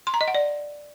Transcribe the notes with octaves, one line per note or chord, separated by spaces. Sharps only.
C6
A#5
D#5
F#5
D5